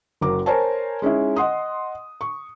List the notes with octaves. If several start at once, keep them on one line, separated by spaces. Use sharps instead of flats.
F#1 F#3 A#4 D6
A#4 C5 C#5 G#5 A5
G#3 C#4 D#4 E4
D#5 F#5 C6 D#6
C#6